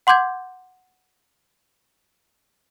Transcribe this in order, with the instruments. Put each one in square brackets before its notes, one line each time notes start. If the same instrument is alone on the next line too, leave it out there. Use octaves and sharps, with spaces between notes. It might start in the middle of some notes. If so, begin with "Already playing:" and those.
[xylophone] F#5 C6 D6 G6 G#6